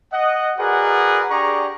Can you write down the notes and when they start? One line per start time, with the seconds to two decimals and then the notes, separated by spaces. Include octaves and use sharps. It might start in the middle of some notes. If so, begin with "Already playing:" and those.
0.13 D#5 F#5
0.58 F#4 G#4 A#4 B4 D5 F#5
1.31 D4 G4 G#4 D5 A#5 C#6